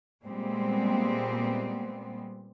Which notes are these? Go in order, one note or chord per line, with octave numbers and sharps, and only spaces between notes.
A#2 G3 G#3 B3 C4